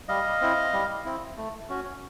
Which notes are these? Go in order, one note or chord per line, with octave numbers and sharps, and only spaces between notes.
G3 D#5 F5
C4 E4
G3
C4 E4
A3
C#4 F#4